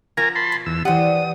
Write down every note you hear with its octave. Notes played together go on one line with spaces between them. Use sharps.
F3 F#4 A#4 G#5 A#5
A5 B5 C6
B2
E2 E6
E3 D4 G4 C5 F#5 D#6